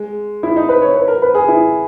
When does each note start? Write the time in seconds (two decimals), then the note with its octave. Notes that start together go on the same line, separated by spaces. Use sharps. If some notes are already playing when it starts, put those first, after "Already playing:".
Already playing: G#3
0.43 E4
0.56 D#4
0.69 B4
0.82 C#5
0.95 B4
1.08 A#4
1.22 B4
1.35 G#4
1.48 E4